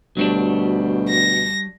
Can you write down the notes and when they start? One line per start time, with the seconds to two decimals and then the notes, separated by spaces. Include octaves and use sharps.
0.17 D2 B2 F#3 G3 D4
1.09 A#6